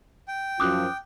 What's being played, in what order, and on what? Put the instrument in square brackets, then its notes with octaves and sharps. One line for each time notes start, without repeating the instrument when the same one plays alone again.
[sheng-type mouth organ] G5
[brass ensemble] F#2 F3 [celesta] D6 D#6 F#6